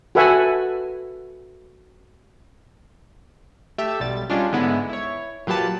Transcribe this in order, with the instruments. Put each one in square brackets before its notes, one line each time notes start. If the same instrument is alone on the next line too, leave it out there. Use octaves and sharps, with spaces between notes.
[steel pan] F#4 A4 B4 E5 F#5 G#5
[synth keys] A3 G4 E5
B1 G3 A6
G3 G#3 C#4 D4 F4
G#2 D3 G#3 B3 E4
E4 C#5
A#2 F#3 G4 B4 A5